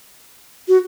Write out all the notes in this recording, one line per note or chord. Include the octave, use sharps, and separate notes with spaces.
F#4